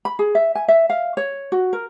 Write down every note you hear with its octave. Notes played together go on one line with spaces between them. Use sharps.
B5
G#4
E5
G#5
E5
F5
C#5
F#4
A#4